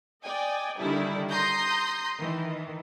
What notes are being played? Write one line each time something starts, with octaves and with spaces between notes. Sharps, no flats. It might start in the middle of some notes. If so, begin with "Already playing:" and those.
D5 D#5 G5 G#5
D3 D#3 G3 D4 E4
A#5 C6 D#6 G6 A#6
D#3 E3